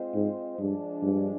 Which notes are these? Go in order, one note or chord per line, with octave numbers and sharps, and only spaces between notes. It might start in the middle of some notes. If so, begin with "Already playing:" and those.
Already playing: G#3 C4 F4 C5 D#5
G#2
G2 F3 G#3 D4
G2